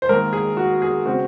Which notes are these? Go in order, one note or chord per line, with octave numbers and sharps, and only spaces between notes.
C5
G#2 D#3 A#3 A#4
G#4
F#4
G#4
C#3 G#3 C4 F#4